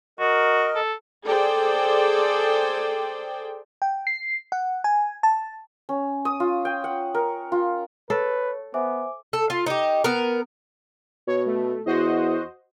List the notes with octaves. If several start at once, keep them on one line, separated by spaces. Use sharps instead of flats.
F#4 A#4 D#5
A4
G#4 A4 C5 D5 G5
G5
C7
F#5
G#5
A5
C#4
D#6
F4
G5
F#5
A#4
F4
A4 B4 C#5
B3 C5 E5 G#5 D6
A4
F4
D#4 G4
B3 A#4
B2 C#5
A3
E2 F#4 C5 D#5